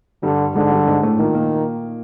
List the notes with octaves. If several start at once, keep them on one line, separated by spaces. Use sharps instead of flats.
G2 D3 G3
G#2 D3 G#3
G2 G3
G#2 G#3
A2 A3
A#2 D#3 A#3
A#2 A#3